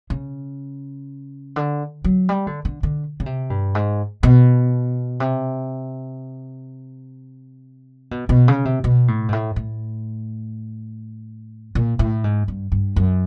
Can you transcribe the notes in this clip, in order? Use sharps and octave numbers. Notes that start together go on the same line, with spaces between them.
C#3
D3
F#3
G3
D3
D3
D3
C#3
C3
G2
G#2
B2
C3
B2
B2
C#3
C3
B2
A2
G#2
A2
A2
A#2
A2
G#2
G2
G2
F#2